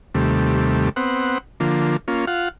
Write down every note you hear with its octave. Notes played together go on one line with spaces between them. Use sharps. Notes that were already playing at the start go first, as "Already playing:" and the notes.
D#2 C3 G3 A3
B3 C4 F#5
D3 F3 A#3
A#3 C#4 F4
F4 F5 F#5